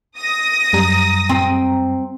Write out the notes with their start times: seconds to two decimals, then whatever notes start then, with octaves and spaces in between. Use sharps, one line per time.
0.18 D#6 A#6
0.73 F#2 G3 A#5
1.29 C4